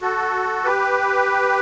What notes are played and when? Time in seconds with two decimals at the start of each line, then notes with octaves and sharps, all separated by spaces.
0.02 F#4 A4
0.64 G4 B4